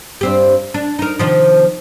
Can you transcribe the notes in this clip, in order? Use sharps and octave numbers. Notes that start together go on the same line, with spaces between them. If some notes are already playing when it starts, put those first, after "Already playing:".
G2 C4 G4
D4
D#4 A#4
C3 D#3 F3